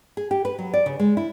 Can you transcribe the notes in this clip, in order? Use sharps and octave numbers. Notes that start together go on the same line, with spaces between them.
G#4
G4
B4
F#3
D5
C#3
G#3
E4